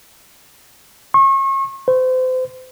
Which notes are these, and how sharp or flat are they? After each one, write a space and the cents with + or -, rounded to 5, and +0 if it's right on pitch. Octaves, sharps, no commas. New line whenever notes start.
C#6 -35
C5 -35